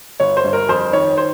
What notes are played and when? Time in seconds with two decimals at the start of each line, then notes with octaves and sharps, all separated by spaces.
0.20 G1 C#5
0.37 C5
0.44 G2
0.53 A#4
0.69 F2 C5
0.93 D#3 C#5
1.17 C5